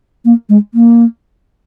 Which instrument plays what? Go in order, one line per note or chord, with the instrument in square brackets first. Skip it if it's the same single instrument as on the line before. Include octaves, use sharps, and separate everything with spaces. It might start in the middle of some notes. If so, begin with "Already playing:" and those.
[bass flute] A#3
G#3
A#3